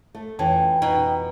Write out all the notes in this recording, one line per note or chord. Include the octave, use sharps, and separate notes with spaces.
A3
F2 E3 C#4 G5
B2 D#4